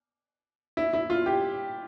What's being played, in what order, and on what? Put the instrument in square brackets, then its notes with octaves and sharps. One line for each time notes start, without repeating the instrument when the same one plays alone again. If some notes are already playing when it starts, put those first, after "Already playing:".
[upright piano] E4
E4
F4
G4